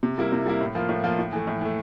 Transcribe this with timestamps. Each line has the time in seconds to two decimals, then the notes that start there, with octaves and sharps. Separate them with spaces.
0.03 C3
0.18 G3 A#3 E4
0.32 C3
0.46 G3 A#3 E4
0.61 A2
0.75 F3 A#3 F4
0.89 A2
1.04 F3 A#3 F4
1.19 A2
1.33 E3 A3
1.47 A2
1.61 E3 A3